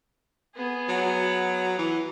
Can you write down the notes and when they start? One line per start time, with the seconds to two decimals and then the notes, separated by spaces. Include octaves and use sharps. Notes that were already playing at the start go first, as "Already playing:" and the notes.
0.55 B3 G#4
0.89 F#3
1.78 E3